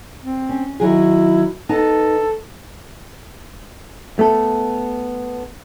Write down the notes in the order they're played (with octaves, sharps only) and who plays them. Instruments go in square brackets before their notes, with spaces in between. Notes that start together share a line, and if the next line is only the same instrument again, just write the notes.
[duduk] C4
[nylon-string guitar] C#4
[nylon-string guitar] D#3 F#3 G#4 [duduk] E4
[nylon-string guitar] B3 D#4 A5 [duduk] A4
[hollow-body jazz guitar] A3 B3 A4